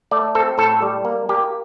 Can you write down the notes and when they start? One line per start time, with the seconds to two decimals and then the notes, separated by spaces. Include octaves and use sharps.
0.11 A3 D5
0.35 C4 A4
0.58 A2 A4
0.82 G3
1.05 A#3
1.29 A#3 G4